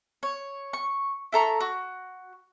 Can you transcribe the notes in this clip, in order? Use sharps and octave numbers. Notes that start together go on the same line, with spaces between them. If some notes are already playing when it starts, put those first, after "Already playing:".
C#5
C#6
E4 A4 A#5 C#6
F#4